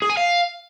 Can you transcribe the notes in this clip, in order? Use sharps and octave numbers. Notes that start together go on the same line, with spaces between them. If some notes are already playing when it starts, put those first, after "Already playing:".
G#4
G#5
F5